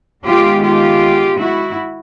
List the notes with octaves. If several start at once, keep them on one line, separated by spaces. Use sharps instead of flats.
D#3 G#3 B3 F4 G4
F4 G4
E4 F#4